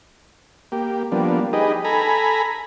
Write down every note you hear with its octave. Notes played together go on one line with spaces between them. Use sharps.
A#3 G4
F3 G3 A#3 B3 D4
D#4 G4 G#4 B4 D#5
A4 G#5 A#5 B5